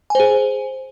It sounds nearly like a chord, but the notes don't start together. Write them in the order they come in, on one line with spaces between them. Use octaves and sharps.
G#5 C5 G#4